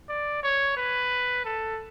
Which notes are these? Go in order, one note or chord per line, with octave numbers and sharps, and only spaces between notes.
D5
C#5
B4
A4